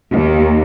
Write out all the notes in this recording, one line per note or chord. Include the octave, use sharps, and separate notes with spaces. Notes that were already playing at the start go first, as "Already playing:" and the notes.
D#2